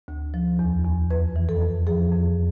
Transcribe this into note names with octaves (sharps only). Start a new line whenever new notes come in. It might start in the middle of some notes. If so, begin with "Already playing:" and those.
D2
F3
E2
E2
F2 B4
E3
A4
F2
F3 G#4
F2